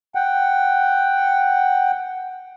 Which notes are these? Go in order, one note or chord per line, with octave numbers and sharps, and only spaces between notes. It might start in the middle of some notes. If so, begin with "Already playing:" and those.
F#5 G5